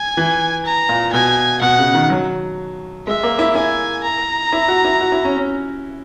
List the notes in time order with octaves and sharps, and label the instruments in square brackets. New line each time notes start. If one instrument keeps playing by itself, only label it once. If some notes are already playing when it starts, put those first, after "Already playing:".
Already playing: [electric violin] G#5
[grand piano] E3
[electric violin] A#5
[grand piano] A#2
[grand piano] B2 [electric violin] G#5
[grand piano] B2 [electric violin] F#5
[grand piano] C#3
D#3
F#3
[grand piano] G#3 [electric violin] E5
[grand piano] A#3
E4
[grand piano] E4 [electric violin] G#5
[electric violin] A#5
[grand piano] E4
F#4
E4
F#4
E4
C#4
C#4